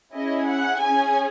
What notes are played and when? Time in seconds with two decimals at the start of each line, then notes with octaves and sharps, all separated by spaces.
0.14 C#4 E4 G#4 D#5
0.48 F#5
0.81 C#4 G#4 G#5